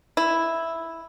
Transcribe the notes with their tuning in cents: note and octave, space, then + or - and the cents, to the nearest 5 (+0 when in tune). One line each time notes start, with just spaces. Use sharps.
E4 +0